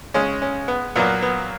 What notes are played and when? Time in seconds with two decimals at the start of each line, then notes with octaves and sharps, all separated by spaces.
0.14 C#3 G#3 C#4
0.42 C#4
0.68 B3
0.95 A#2 F#3 A#3 B3
1.22 B3